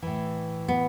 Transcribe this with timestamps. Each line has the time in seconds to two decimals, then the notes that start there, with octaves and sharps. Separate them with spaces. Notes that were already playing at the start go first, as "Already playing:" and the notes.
0.02 A2 E3
0.68 B3